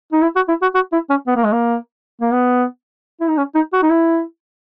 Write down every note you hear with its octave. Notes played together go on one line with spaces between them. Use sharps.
D#4
E4
F#4
E4
F#4
F#4
E4
C#4
B3
A#3
G#3
A#3
A#3
B3
E4
D#4
C#4
D#4
F#4
D#4
E4